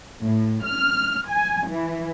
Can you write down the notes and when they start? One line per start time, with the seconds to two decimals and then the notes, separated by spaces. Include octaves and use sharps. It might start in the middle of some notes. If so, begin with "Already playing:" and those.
0.20 A2
0.64 F6
1.28 G#5
1.67 E3